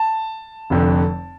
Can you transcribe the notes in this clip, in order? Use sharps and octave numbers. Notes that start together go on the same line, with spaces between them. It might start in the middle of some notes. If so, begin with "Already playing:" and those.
Already playing: A5
F1 F2 D3